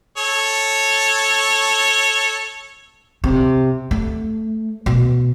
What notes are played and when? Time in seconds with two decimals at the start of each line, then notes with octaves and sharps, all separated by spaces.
0.17 A4 C#5
3.24 C3
3.91 A3
4.86 B2